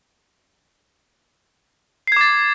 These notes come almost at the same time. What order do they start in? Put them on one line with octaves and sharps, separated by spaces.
C7 G#6 D6 A6